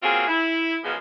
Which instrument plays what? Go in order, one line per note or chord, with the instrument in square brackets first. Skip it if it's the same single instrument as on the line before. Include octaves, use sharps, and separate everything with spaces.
[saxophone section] A#3 C4 C#4 F4 F#4 G#4
E4
F#2 C#3 F3 G#3 B3